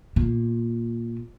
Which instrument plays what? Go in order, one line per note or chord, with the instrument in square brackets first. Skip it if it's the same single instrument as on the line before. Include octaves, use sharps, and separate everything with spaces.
[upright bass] A#2